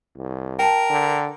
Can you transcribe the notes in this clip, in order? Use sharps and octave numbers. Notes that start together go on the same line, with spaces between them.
C2
A#4 G5 A5
D3